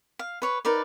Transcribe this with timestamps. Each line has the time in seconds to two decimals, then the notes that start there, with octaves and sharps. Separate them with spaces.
0.19 F5
0.42 B4 C#5
0.65 D#4 A#4 B4 D5